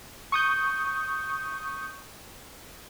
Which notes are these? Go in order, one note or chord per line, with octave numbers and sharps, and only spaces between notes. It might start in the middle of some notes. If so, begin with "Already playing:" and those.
C#6 D#6 G6